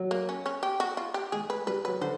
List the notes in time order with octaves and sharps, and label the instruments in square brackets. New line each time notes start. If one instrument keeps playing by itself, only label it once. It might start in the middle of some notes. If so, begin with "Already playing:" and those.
Already playing: [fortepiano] F#3
[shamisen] A#3
C#4
C#4
G4
F#4
F4
G4
[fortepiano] G#3 [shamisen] G#4
[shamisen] B4
[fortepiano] G3 [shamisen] B4
[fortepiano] F#3 [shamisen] B4
[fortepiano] D3 [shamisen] C5